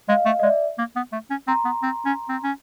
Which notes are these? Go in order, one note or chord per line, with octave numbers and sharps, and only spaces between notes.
G#3 D#5 F5
A3
D#5
G#3 D5 E5
A#3
B3
A3
C#4
C4 A#5 C6
B3
C4
C#4
C4
C#4